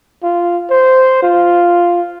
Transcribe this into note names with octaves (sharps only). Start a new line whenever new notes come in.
F4
C5
F4